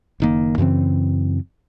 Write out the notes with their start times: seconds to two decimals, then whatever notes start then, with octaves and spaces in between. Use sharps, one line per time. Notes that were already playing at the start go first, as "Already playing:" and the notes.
0.20 F#1 D#3 A#3
0.58 F#2 C#3 E3 C4